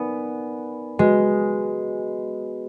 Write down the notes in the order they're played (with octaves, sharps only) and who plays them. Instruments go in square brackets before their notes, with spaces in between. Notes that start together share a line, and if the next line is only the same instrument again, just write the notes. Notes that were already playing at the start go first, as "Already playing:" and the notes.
Already playing: [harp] B3 [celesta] D#4 A#4 D5 G#5
[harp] G#3 [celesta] F#4 B4 D#5